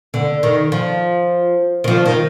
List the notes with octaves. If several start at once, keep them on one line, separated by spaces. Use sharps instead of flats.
D3
D#3
F3
D#3
F3
D#3